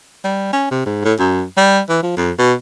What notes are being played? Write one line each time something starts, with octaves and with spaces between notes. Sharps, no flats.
G3
C#4
C3
G#2
A2
F#2
G3
E3
F3
F2
B2